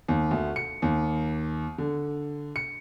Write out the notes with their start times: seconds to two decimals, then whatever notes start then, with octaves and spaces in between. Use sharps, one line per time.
0.08 D#2
0.31 D2
0.56 C#7
0.82 D#2
1.78 D3
2.56 C#7